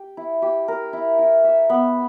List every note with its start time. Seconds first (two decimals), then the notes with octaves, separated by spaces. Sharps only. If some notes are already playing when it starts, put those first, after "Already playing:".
Already playing: G4
0.17 E4
0.42 G4
0.68 A#4
0.93 E4
1.19 E4
1.44 E5
1.70 B3